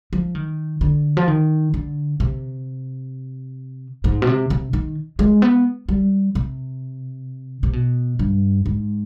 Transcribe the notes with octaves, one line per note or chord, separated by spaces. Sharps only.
F3
D#3
D3
F3
D#3
D3
C3
G#2
B2
C3
C3
D#3
G#3
B3
G3
C3
C3
B2
G2
G#2